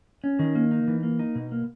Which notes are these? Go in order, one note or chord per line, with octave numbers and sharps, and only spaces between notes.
C#4
D#3
A#3
D#4
E3
A#3
D#4
B2
A#3